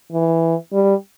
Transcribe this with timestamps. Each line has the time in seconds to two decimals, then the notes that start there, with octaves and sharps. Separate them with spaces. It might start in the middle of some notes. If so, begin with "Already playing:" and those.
0.12 E3
0.72 G3